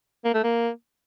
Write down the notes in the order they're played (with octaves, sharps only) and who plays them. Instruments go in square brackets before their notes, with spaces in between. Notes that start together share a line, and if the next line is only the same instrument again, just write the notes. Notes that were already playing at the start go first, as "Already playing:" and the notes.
[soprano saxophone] A#3
A3
A#3